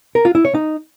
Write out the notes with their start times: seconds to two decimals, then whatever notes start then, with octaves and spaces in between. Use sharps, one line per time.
0.15 A#4
0.25 F4
0.35 E4
0.45 C#5
0.54 D#4